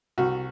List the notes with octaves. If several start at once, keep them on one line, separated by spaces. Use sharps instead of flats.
C2 F#4